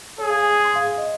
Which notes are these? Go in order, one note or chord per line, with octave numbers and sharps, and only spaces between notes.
G#4 C#5
F5
G#5
D#6
C6
F5
F5
D#5